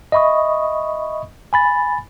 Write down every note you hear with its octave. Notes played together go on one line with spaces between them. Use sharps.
D#5 E5 B5 C#6 D#6
G#5 B5 A6